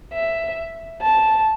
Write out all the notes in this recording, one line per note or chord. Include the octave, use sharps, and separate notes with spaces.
E5
A5